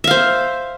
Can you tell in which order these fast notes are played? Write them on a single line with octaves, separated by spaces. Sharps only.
E5 F5 C5